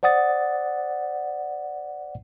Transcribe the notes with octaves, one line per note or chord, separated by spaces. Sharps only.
C5 D5 F#5 D#6 A6